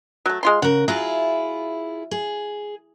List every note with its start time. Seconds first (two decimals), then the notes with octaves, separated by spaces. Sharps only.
0.26 F#3 A3
0.43 G#3 F4 C6
0.62 C#3 A#4 F#5
0.88 F#3 E4 F4 G#4
2.11 G#4